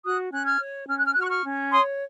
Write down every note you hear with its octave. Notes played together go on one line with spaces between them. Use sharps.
F#4 D#6 F#6
C#4 F#6
F6 G#6
C#5
C#4 F6
F#6
F6
F#6
F#4 C#6 F6
F#6
C#6 F6
C#4
C#5 C6 D#6